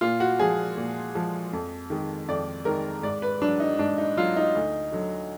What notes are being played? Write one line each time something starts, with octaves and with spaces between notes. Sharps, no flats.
A#2 F4
F#4
F3 G#3 G#4
A#2
F3 G#3
F2
D#3 G#3
F2 D5
D#3 G#3 A#4
G#2 D5
B4
F#3 D4
D#4
G#2 D4
D#4
F#3 F4
D#4
D2
D3 F#3